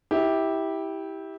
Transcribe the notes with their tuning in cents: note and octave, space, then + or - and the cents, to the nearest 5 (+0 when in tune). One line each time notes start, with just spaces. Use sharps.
E4 -20 G4 +0